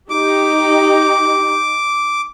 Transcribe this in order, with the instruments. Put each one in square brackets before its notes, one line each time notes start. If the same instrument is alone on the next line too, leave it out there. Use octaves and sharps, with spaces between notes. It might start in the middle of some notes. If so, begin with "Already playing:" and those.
[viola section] D#4 G4 [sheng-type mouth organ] D6